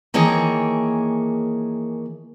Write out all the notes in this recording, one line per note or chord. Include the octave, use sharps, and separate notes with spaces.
D#3 E3 A#3 G#4 C#5 A5